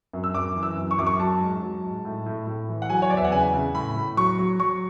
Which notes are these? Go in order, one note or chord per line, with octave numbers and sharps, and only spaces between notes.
F#2
E6
F#2 D6
E3
E6
F#2
C#6
F#2 D6
C#6
F#3 A5
G#2
F#3
G#2
A2
A2
A2
E3
F#5
F#3 G#5
C#5
E2 D5
E5
F#5
C#3 G#5
C#3
A2 B5
A2
F#3 C#6
F#3
F#3 C#6